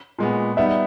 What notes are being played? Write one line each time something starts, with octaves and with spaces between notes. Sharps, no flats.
A#2 G#3 B3
G3 B3 D#4 E5